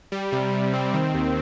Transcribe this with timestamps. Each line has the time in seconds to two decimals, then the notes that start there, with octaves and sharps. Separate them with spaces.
0.12 G3
0.32 C3
0.53 C3
0.73 C4
0.94 D#3
1.14 D#2